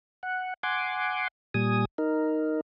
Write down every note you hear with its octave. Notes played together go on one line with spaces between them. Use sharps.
F#5
F#5 G#5 C6 D6
A#2 G3 G#5 D#6
D#4 A#4